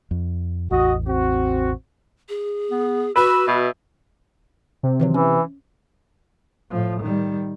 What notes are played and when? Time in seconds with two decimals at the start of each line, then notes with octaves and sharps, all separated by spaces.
0.11 F2
0.71 A1 E2 F#4 D#5
1.07 C4 F#4
2.29 G#4
2.71 B3
3.16 F#4 B4 E6
3.48 B2 E5
4.83 C3
5.00 D#3 E3 F#3
5.14 E3 C#4
6.71 A2 F3
7.01 D#3 G3